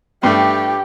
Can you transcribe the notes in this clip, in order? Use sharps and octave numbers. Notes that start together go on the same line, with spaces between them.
G2 A3 G4 G5